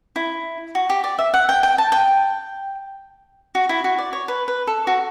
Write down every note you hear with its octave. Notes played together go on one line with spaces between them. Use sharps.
E4
F#4
G4
D5
E5
F#5
G5
G5
A5
G5
F#4
E4
F#4
D5
C#5
B4
B4
A4
F#4